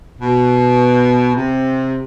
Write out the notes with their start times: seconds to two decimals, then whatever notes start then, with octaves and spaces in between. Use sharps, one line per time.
0.20 B2
1.36 C3